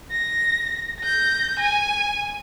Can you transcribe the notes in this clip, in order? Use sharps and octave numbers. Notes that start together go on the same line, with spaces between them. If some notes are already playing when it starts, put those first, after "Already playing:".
A#6
G6 A#6
G#5